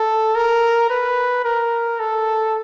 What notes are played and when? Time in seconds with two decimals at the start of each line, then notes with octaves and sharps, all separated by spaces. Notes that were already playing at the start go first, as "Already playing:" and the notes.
Already playing: A4
0.36 A#4
0.90 B4
1.44 A#4
1.99 A4